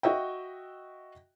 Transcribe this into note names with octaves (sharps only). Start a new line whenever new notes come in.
F#4 D#5 E5 G5